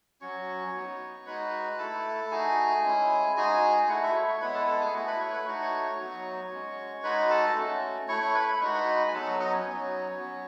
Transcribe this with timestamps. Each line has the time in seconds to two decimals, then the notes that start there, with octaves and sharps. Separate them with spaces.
0.21 F#3 C#4 F#4 C#5 C#6
0.74 B3 D#4 F#4
1.26 G#3 D#4 F#4 B4 B5
1.78 A3 E4 A4 A5
2.31 A3 D#4 F#4 G#4 G#5
2.84 G#3 C#4 E4
3.36 G#3 D#4 F#4 G#4 G#5
3.77 G#5
3.89 A3 E4 F#4 F#5
4.02 E4 E5
4.14 C#5 C#6
4.28 C#5 C#6
4.41 G#3 B3 E4 B4 B5
4.54 A4 A5
4.67 A4 A5
4.80 G#4 G#5
4.93 A3 E4 F#4 F#5
5.07 B4 B5
5.20 C#5 C#6
5.33 B4 B5
5.45 A3 D#4 F#4 C#6
5.61 C#5 C#6
5.99 F#3 B3 D#4 F#4
6.51 G#3 C#4 F#4
7.03 G#3 D#4 F#4 B4 B5
7.29 A4 A5
7.56 A3 C#4 F#4
8.08 A3 E4 C#5 C#6
8.21 C#5 C#6
8.35 B4 B5
8.48 B5
8.61 G#3 D#4 F#4 C#6
8.74 B4 B5
9.08 G#5
9.13 F#3 B3 D#4 A4 A5
9.26 F#4 F#5
9.39 D#4 D#5
9.53 C#4 C#5
9.66 F#3 B3 D#4 F#4
10.19 F#3 B3 F#4